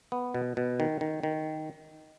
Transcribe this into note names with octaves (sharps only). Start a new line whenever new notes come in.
B3
B2
B2
D#3
D#3
D#3